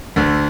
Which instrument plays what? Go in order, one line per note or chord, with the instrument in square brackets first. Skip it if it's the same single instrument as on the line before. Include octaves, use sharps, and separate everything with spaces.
[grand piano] D2 D3